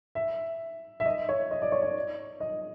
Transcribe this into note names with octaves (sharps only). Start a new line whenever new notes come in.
E5
E5
D#5
C#5
D#5
D5
C#5
D5
D#5